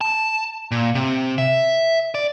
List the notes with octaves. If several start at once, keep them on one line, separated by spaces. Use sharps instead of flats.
A5
A#2
C3
E5
D5